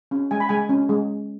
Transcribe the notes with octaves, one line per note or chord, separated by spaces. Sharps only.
C#4
G#3 G#5
B5
G#3 G#5
C#4
G#3